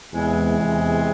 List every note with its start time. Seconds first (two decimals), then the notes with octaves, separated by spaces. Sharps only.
0.13 E2 C3 E3 G#3
0.59 E2